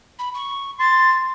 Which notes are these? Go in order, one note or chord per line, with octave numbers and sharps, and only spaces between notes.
B5
C#6
C6 A6